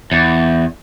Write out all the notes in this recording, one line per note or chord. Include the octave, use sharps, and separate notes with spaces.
E2